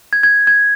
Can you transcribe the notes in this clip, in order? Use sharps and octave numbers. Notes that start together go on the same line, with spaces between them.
G#6
G#6
G#6